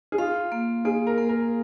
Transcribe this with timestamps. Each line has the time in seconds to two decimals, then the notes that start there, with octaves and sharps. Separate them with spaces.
0.12 G#4
0.18 F4 F5
0.52 A#3
0.85 A#3 G#4
1.07 A#4
1.18 A#3
1.29 A#4